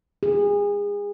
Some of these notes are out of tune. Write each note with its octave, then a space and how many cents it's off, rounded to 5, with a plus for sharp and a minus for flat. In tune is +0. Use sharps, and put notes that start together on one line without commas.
G#4 -30